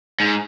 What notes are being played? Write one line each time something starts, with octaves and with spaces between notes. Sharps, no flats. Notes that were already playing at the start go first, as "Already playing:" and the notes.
G#2